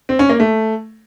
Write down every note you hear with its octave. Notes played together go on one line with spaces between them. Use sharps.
C4
C#4
A#3
A3